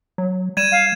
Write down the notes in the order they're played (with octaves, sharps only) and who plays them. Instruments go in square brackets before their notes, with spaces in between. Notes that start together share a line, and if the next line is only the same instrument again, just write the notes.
[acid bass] F#3
[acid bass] G3 [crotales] G#6 D#7 E7
[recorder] F5